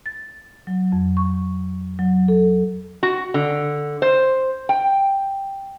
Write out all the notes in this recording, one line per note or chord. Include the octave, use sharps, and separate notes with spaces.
A6
F#3
F2
C#6
F#3
A4
F#4
D3
C5
G5